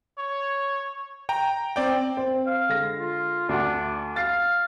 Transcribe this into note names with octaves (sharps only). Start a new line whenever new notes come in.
C#5
G5 A#5
C4 D5 G5
C4
F5
D3 G#3 A#6
F4
D2 D4 F#5
F5 A6 C7